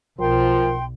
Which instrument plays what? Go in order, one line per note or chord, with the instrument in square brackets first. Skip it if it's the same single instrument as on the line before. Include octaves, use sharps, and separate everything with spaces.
[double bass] B1 [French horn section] F3 A#4 [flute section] G5 C6